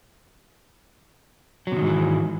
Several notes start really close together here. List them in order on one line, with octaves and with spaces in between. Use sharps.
F#3 C3 D#3 G#2 E3